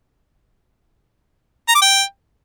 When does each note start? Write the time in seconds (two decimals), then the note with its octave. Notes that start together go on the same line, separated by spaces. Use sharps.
1.69 A#5
1.75 D6
1.82 G5